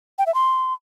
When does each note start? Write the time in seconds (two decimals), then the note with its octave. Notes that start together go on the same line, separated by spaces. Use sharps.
0.19 G5
0.26 E5
0.34 C6